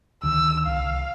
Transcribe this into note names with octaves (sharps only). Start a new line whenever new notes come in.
D2 D#3 E6
C2 F5